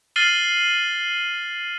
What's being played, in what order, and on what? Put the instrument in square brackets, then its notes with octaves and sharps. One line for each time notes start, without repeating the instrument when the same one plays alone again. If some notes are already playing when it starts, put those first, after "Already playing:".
[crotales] F6 A6 C7 D#7 F#7 G7